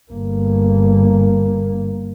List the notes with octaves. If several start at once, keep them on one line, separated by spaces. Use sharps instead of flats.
G1 A#3